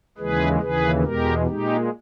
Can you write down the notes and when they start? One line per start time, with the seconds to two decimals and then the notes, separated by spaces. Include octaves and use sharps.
0.18 D#2 C#3 E3 G#3 G#4 B4
0.61 D#2 C#3 E3 G#4 B4
1.03 E2 B2 G#3 G4 A#4
1.46 A#2 G#3 D#4 G4